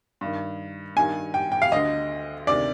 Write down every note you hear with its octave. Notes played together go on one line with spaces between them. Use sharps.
G2 D#3
G2 D#3 G#5
G5
G5
F5
D2 D3 D#5
D2 C3 D#3 D5